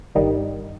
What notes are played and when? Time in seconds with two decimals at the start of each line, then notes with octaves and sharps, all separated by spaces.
0.15 G1 G2 D#3 G3 D#4